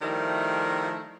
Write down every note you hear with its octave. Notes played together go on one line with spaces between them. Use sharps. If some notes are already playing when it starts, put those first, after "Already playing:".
D#3 F3 G3 A3 E4 A#4